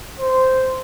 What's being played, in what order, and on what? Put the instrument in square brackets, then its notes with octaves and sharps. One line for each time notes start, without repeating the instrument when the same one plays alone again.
[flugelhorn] C5